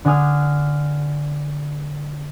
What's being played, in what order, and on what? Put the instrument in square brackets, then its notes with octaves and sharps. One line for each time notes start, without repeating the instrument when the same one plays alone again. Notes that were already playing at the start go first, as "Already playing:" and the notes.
[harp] D3 D4 G#5 D#6 F6